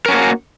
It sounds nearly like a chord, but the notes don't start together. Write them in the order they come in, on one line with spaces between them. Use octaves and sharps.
A#4 C#4 F#4 A#3